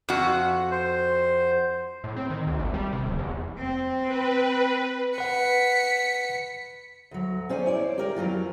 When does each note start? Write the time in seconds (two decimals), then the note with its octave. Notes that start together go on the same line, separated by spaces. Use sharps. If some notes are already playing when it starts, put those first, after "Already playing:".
0.09 F2 F#4
0.71 C5
2.04 A2
2.16 C4
2.30 D#3
2.47 D2
2.59 G#1
2.74 G3
2.93 C3
3.06 D1
3.18 E2
3.58 C4
4.02 B4
5.18 B4 F#5 B6 C#7
7.11 D2 F#3
7.49 C#4 C5 D5 F5 G#5
7.66 E4 C#5 D5
7.98 G4 A#4 D5
8.16 F2 E3 F#3 F4